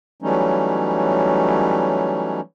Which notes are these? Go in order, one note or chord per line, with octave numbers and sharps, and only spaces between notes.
E3 F#3 G3 A3 C#4 D#4